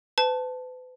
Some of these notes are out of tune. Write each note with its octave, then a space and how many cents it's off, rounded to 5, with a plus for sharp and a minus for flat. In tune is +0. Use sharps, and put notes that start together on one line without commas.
B4 +40 A5 +0